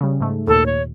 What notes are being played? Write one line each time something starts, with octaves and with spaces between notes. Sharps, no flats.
C#3 G3
G#2 A3
D#2 A#2 A4
C#5